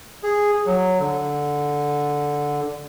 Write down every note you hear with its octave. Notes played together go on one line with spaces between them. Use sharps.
G#4
F#3
D3